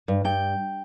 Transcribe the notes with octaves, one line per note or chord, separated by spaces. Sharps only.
G2
G2 G5